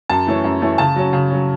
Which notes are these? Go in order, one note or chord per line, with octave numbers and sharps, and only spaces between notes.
F#2 A5
E3 A3 C#4
F#2
E3 A3 C#4
C#3 A5
F#3 C#4
C#3
F#3 C#4